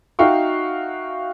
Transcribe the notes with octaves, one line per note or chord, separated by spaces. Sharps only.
D#4 F#4 E5 F5 G5 C#6